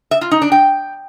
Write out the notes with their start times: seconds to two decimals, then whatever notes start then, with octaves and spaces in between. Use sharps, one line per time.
0.11 E5
0.21 F4
0.31 D#4
0.42 D4
0.52 G5